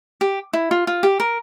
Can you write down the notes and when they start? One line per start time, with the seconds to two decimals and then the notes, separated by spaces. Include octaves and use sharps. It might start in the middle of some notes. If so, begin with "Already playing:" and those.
0.21 G4
0.53 E4
0.71 F4
0.87 F4
1.03 G4
1.20 A#4